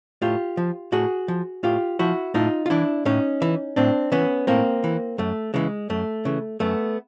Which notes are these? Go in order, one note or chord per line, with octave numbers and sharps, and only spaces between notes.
A2 F4 G4
F3
A2 F#4 G#4
F3
A2 F4 G4
F3 E4 F#4
A2 D#4 F4
F4
E3 D4 E4
A2 C#4 D#4
E3
A2 C4 D4
E3 B3 C#4
A2 A#3 C4
E3
F#2 A3
C#3 E3 G#3
F#2 A3
C#3 E3
F#2 A3 B3